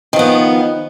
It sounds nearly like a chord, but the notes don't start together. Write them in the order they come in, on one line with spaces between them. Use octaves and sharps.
D#3 F3 B3